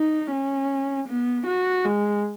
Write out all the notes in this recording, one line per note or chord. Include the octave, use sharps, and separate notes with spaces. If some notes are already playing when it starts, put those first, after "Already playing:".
Already playing: D#4
C#4
B3
F#4
G#3